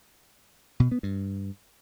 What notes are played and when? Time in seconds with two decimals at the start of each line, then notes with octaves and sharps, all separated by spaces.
0.80 B2
0.92 B3
1.03 G2